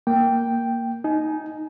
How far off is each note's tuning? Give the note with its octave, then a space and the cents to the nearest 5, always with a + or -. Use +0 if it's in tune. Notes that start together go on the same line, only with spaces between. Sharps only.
A#3 +0 G5 +0
D#4 +0 G#5 +30